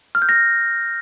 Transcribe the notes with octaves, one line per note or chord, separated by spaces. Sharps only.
F6
G6
A#6